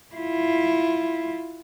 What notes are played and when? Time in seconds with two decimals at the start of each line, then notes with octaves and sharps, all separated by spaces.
0.15 E4 F4